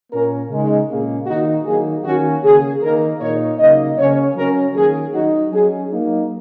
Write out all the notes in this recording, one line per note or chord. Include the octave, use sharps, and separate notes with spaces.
A#2 A#3 C#4 A#4
C#3 G#3 D#4
A#2 A#3 C#4 G#4
D#3 A#3 D#4 F#4
D#3 F#3 A#3 D#4 G#4
D#3 A#3 C#4 F#4
C#3 A#3 C#4 G#4
D#3 A#3 D#4 A#4
A#2 A#3 D#4 C#5
C#3 F#3 A#3 D#4 D#5
C#3 A#3 C#4 C#5
F#3 C#4 A#4
D#3 A#3 C#4 G#4
F#3 D#4 F#4
F#3 C#4 G#4
F#3 A#3 D#4